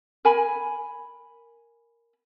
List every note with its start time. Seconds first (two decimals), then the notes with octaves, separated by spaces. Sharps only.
0.25 A#4 G#5 B5